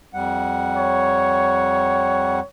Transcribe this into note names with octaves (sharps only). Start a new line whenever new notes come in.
F2 G3 F#5
C#5